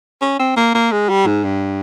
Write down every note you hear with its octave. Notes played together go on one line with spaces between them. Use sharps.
C#4
C4
A#3
A#3
G#3
G3
G#2
G2